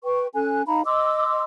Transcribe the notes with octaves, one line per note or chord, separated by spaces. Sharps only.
B4 G5 C#6
C#4 A4 G#5 F#6
D#4 F5 A#5 B5
D#5 C6 D6 E6